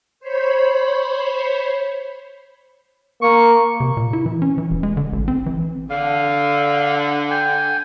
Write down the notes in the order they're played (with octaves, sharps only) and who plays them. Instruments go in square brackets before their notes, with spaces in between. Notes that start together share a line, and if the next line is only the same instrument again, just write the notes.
[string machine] C5 C#5 B5
[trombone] A#3 [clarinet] C#6
[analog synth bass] C3
A#2
E4
E3
C#4
E3
E1
G#3
D3
A1
C4
E3
[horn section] D3 [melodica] F5
[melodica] G5 G#5